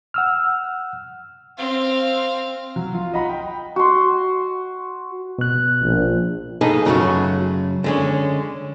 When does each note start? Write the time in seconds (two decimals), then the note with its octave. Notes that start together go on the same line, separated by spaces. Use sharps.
0.14 F#5 E6 F6
1.57 C4 F5
2.76 F#3
2.94 F4
3.14 D#5 F#5 A#5 B5
3.29 G5
3.76 F#4 C6
5.38 B2 F#6
5.82 A#1
6.61 D#4 G#4 A4 B4 D#5
6.85 F#2 C#3 F#3 G#3 A3 F#4
7.84 D3 G#3 C#4